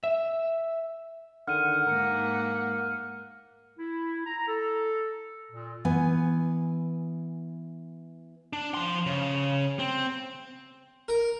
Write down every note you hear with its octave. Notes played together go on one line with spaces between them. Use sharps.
E5
D3 D#3 F#5 F6 D#7
G#2 A#3 A#4 C#7
E4
A#5
A4
A#2
E3 B3 G#5
D4
F3 C6
C#3
C4
A#4